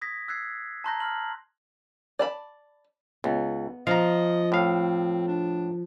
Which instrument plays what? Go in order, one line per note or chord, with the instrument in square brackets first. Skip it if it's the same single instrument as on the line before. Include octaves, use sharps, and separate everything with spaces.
[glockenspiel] D#6 G#6 A#6 B6
E6 F#6 G#6 C7
A5 A#5 C6 F#6 G6 A#6
C6 F6 G6 F#7
[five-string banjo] D5 A5 B5
[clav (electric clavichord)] C#2 [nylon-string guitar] B3
[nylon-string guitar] F3 [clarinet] D#5 [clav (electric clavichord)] F5 A#5
[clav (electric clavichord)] A2 F5 [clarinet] C4
[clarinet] D4